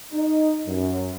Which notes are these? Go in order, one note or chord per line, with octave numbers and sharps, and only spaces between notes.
D#4
F#2